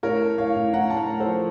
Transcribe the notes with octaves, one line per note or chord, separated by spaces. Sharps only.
A2 A#4 C#5
A3
A2 C#5 F5
A2
A2 F#5 A#5
A2 A5
F#5 A#5
A2
A4 C5
F3